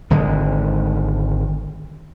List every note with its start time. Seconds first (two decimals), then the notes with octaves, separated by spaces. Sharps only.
0.10 G#1 D3 G#3